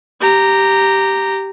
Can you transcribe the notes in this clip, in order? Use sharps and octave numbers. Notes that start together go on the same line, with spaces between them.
G4 A#5